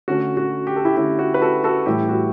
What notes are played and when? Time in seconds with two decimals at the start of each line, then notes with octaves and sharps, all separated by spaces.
0.08 D3 A3 C#4 F#4
0.37 F#4
0.67 G4
0.76 A4
0.85 E4 G4
0.97 D3 A3 C#4 E4 G4
1.19 F#4
1.34 B4
1.42 F#4 A4
1.64 F#4 A4
1.86 A2 E3 G3 E4 G4
2.09 F#4